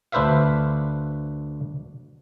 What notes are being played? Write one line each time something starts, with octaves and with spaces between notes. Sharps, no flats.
D2 D4 B4 C5 E5 F5